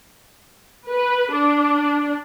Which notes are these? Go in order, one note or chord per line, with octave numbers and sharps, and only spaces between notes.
B4
D4